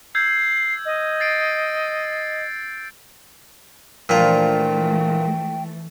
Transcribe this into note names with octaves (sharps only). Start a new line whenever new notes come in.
E6 G6 G#6 C7
D#5
A6 C7 D7
A#2 E3 F3 A3 D4 F4 G5